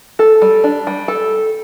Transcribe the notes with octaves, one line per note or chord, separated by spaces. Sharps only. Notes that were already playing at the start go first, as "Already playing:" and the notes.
A4
G3
D4
G3
A4